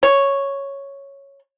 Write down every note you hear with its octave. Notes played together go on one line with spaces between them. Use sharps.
C#5